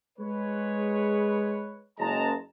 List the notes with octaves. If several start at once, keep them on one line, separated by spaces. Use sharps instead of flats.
G#3 B4 C#5
F#1 G#3 A5 A#5